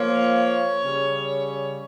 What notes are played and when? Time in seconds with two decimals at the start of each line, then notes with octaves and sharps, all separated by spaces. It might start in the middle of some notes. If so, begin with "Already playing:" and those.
Already playing: F3 A#3 F4 C#5
0.84 C#3 G3 C#4